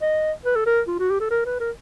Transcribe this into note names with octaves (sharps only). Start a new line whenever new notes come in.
D#5
B4
A4
A#4
F4
F#4
G4
A4
A#4
B4
A#4